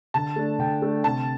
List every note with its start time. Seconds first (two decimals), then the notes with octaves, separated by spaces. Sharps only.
0.14 D3 A5
0.36 A3 D4
0.59 D3 G5
0.82 A3 D4
1.04 C3 A5